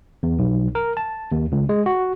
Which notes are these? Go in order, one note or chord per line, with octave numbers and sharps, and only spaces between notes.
E2
B1
A#4
A5
D#2
C#2
G#3
F#4